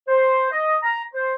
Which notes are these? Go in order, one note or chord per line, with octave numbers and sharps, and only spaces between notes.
C5
D#5
A#5
C5